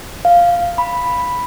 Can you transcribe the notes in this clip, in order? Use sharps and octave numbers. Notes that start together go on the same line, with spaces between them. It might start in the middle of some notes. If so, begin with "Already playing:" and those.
F5
B5